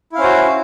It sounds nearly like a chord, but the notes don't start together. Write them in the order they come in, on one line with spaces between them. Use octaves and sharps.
E4 F5 C#4 C5 F#4